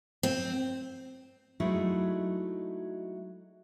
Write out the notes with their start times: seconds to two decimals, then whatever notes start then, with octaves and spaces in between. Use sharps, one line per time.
0.23 C4
1.60 F#3 G#3 A3 D#4 E4